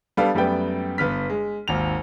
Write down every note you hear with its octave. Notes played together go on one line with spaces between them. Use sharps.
G3 B3 D4 A4 F5
F#2 G3 A3 B3 G5
G1 B3 F6 B6
G#3
G#1 D#2 F7